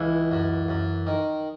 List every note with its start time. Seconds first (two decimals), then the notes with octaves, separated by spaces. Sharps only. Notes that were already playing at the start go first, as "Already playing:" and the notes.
Already playing: C#2 E3
0.31 F#2
0.68 F#2
1.07 D#3